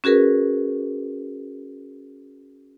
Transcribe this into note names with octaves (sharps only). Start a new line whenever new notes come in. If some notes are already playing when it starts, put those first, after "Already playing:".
C#4 F#4 G#4 A#4 B4